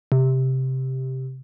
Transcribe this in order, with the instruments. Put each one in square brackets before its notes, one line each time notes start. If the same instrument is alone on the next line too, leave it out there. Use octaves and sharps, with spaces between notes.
[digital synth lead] C3